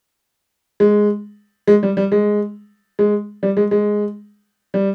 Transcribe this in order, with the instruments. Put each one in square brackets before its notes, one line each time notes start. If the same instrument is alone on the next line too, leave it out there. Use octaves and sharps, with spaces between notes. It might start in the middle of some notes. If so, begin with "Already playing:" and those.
[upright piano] G#3
G#3
G3
G3
G#3
G#3
G3
G#3
G#3
G3